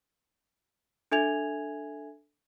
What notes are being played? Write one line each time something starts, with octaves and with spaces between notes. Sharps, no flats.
D4 A4 E5 G#5 G#6 F7